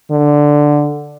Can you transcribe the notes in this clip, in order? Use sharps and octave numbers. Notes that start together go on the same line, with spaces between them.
D3